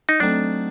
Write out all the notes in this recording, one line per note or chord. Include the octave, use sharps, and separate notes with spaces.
D#4
F#3 A3 C4 D4 D#4